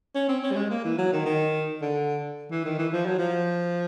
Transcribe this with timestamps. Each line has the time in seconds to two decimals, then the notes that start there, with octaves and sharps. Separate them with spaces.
0.15 C#4
0.29 C4
0.43 C#4
0.51 G3
0.56 G#3
0.70 A#3
0.85 E3
0.98 F#3
1.13 D#3
1.25 D#3
1.82 D3
2.51 E3
2.65 D#3
2.78 E3
2.93 F3
3.06 F#3
3.19 F3